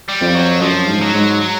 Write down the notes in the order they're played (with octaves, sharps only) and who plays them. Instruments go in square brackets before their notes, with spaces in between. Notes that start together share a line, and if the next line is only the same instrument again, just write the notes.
[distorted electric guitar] G3
[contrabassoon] F2
[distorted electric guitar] F#3
[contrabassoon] F#2 [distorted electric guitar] F3
[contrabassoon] G#2
[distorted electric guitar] F#3
[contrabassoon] G#2
[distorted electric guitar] F#3